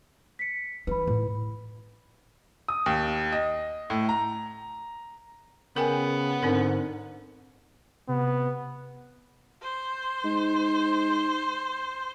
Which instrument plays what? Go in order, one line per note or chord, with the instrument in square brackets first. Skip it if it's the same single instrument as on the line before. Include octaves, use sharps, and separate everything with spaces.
[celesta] B6 C#7
[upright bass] E3 D#4 [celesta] B4 B5
[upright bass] A2
[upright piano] D#6
D#2
D#5
A2
A#5
[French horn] C#3 [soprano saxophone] B3 [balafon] A#4 G5 G#5
[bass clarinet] G#2 [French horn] D3 [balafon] C4 D4 A#4
[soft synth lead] C3 [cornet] B3
[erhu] C5
[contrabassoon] G#2